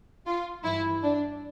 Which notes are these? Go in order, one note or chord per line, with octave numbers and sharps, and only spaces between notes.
F4
G2 E3 E4
D4